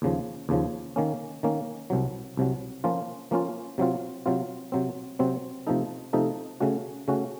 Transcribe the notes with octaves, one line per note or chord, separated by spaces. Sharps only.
D#2 C#3 F3
D#2 C#3 F3
D#3 A#3 C#4
D#3 A#3 C#4
C2 C3 F#3
C2 C3 F#3
F3 A#3 C#4 F4
F3 A#3 C#4 F4
C3 F#3 C4 F4
C3 F#3 C4 F4
C3 F#3 C4
C3 F#3 C4
C3 F3 A3 D#4 A4
C3 F3 A3 D#4 A4
C#3 A3 C#4 F#4
C#3 A3 C#4 F#4